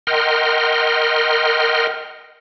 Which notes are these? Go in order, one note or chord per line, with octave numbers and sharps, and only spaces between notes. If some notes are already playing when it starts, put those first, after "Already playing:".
A#4 D#5 F#5 G5 C6 F6